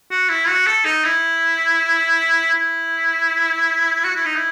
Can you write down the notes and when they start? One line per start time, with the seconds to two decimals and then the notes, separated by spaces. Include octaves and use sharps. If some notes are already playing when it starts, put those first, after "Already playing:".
0.11 F#4
0.30 E4
0.48 F#4
0.67 A4
0.85 D#4
1.05 E4
2.54 E4
4.05 F#4
4.15 E4
4.25 D#4
4.36 E4